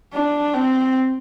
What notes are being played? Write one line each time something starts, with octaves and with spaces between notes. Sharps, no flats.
D4
C4